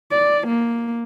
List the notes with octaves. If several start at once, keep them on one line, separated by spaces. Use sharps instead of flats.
D5
A#3